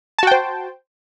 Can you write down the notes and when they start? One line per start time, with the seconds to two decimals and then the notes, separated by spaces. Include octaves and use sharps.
0.19 A5
0.23 F#4
0.27 G5
0.31 C5